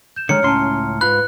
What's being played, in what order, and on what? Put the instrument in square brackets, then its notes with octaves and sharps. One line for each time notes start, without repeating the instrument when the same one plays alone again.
[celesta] G6 E7
[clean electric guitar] D3 D#3 G#3 [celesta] C#5 A#5 F6 [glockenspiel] C#7
[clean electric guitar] C#2 A2 C6 [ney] C#4 [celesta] A5 A#5 F6
[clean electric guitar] G#2 F4 B5 [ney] B4 [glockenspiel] F#6